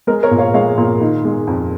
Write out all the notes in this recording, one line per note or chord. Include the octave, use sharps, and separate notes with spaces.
G#3 A#4
A#4 C#5
A#2
C#5 F5
G#3 C#5 F5
A#2
D#3
G#3
F2